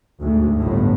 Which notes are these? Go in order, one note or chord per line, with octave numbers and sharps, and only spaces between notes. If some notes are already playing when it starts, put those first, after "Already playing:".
D2 G#2
G1 A2